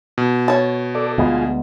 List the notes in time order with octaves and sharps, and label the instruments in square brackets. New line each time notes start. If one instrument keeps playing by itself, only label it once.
[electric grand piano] B2
[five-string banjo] C#5 A5
[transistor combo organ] A4 D5
[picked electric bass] D2 G#3 B3 [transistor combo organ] F4 G#4